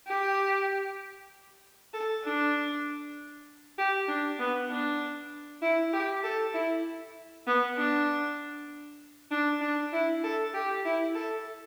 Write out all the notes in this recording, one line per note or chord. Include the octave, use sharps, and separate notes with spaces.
G4
A4
D4
G4
D4
B3
D4
E4
G4
A4
E4
B3
D4
D4
D4
E4
A4
G4
E4
A4